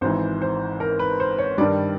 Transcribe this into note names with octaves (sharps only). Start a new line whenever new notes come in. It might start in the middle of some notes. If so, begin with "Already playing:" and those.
G#1 G#2 E3 C5
C5
A#4
B4
C5
C#5
G2 D#3 G3 D5